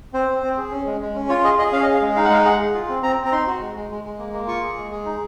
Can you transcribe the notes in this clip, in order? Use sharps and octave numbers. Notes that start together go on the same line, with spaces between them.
C4 C5
C4
C4
G#4
C#4
G#3
G#3
C#4
F4 C#5
G#4 D#5
G#4 D#5
C#4 F5
G#4 D#5
F5
G#3
D#4 F5
F#5
G#3 F5
G#4 F#5
G#4
F4
C4
C4 A#5
C4
A#5
D#4 C6
F#4
G#3
G#3
G#3
G#3
A#3
A#3
F4 C#6
G#4
G#3
G#4
D#4